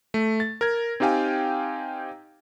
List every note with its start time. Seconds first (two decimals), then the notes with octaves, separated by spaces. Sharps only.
0.14 A3
0.40 A6
0.61 A#4 G#6
1.00 C4 D#4 G4 F5 G5 G#5